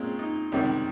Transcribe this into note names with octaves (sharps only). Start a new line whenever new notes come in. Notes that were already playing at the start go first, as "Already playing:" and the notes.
Already playing: A#2 G#3 C4 C#4 F4
D#4
C#2 C3 D#3 G3 C4 C#4